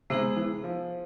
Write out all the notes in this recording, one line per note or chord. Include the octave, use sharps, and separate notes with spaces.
C3 G#3 B3 D#4 G#4 C5
E3
F3